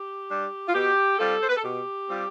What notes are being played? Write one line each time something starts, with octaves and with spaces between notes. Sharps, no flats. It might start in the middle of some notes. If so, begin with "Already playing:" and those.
Already playing: G4
G3 D4
F4
B2 G4
G3 C4 F4 A4
C5
B4
A4
B2 G4
G3 C4 F4